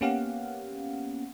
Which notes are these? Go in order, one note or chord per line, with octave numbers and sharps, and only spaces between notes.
A#3 B3 C#4 G4 F5 F#5